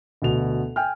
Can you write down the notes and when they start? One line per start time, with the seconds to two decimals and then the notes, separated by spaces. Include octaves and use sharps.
0.22 D2 B2 F7
0.76 G5 G#5 F6